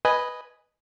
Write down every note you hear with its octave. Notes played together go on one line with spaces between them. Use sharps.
B4 D#5 G#5